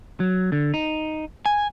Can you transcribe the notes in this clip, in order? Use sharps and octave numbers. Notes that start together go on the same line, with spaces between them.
F#3
D3
D#4
G#5